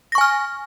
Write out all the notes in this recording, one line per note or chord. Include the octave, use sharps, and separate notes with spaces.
G#5 C#6 F6 A#6